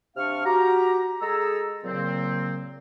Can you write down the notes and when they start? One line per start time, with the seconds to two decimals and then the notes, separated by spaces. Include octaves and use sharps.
0.17 C3 D4 F5 C#6 F6
0.45 F#4 G4 A#5
1.22 G#3 G#4 A4 A#5 E6
1.85 A#2 C#3 F#3 A#3 C4